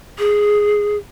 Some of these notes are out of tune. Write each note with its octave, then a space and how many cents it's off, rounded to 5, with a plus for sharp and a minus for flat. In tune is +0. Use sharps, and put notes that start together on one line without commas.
G#4 +0